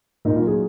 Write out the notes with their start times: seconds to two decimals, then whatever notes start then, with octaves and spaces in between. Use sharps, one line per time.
0.25 A#2 D#4
0.36 F4
0.42 F#3
0.47 G#4